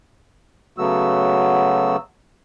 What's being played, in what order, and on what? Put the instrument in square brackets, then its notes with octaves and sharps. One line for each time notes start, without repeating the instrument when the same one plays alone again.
[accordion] C#3 F#3 A3 B3 F#4 E6